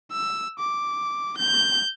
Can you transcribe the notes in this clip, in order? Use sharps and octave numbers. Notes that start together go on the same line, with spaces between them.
E6
D6
G6